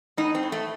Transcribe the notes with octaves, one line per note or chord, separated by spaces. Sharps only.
A2 D#4
C4
A2
A3